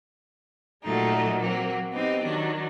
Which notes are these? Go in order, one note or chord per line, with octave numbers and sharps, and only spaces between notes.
A#2 F#3 G#3 A3 D#4
F#3 A#3 C4
B3 C4 D#4 G4
D#3 F#3 D4